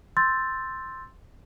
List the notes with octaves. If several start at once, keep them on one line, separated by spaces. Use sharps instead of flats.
C6 E6 G6 A6